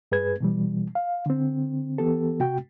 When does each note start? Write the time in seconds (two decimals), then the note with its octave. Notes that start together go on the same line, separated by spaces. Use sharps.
0.12 G2 G#4 B4 G#6
0.40 B2 E3 G3
0.95 F5
1.26 D3 C4
1.98 E3 B3 G4 A4
2.40 C3 F#4 G5